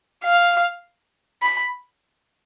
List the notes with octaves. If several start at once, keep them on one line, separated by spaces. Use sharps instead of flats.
F5
B5